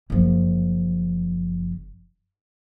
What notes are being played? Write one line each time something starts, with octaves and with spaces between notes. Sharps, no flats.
F#1 F3